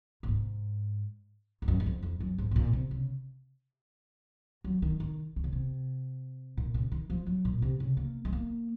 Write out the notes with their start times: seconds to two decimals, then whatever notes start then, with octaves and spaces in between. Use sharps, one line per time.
0.23 A#2
0.28 G#2
1.62 F2
1.68 F#2
1.80 F#2
1.86 F2
2.02 F2
2.20 F#2
2.38 G#2
2.51 C3
2.56 A#2
2.73 C3
2.91 C#3
4.64 F#3
4.82 D#3
5.00 D#3
5.36 D#3
5.44 C#3
5.53 C3
6.57 A#2
6.74 C#3
6.92 D#3
7.10 F3
7.26 F#3
7.45 A#2
7.62 C3
7.80 C#3
7.97 A#3
8.25 G#3
8.32 A#3